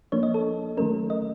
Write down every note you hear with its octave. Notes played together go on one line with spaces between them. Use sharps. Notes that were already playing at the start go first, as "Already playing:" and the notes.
F3 A#3 D4 C#5
D#5
A4
D#3 F#3 A3 C#4 A#4
D#5